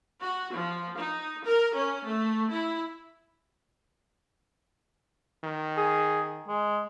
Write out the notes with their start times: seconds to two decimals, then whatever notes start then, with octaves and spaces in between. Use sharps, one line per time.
0.22 F#4
0.53 F3
0.97 D#4
1.44 A#4
1.74 C#4
2.06 A3
2.50 E4
5.44 D#3
5.77 G#4
6.48 G#3